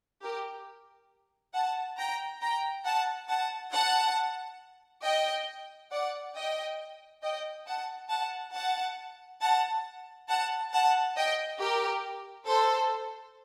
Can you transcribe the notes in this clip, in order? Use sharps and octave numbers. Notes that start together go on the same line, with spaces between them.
G4 A#4
F#5 A5
G5 A#5
G5 A#5
F#5 A5
F#5 A5
F#5 A5
D#5 G5
D5 F#5
D#5 G5
D#5 G5
F#5 A5
F#5 A5
F#5 A5
F#5 A5
F#5 A5
F#5 A5
D#5 G5
G4 A#4
A4 C5